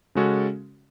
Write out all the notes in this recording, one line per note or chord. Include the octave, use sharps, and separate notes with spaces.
C#3 G#3 C#4 F#4 A4